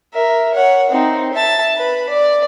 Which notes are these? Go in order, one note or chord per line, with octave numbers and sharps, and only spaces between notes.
A#4 E5
C#5 F#5
C4 D#4
E5 A5
B4
D5